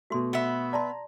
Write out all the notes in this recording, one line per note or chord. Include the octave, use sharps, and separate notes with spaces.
B2 A3 F#4 C6
B3 E5
D5 A5 A#5 C6